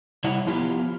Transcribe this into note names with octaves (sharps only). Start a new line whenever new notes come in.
C3 G3 E4 C#5 D#5 F#5
F3 B3 E4 F4 G4